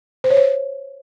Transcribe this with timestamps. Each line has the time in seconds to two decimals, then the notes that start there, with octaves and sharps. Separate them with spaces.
0.24 C5
0.30 C#5
0.37 C5